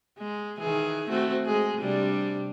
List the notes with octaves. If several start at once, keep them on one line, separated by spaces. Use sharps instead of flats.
G#3
D#3 E3 G#4
A3 C4 F#4
G#3 G#4
C3 G3 D4